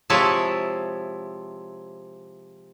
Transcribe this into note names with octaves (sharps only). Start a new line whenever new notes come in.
C3 F3 G#3 E4 C#5 A5